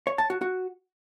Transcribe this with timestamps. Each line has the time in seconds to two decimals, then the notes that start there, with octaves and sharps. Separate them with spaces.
0.07 C#5
0.18 A5
0.30 F#4
0.41 F#4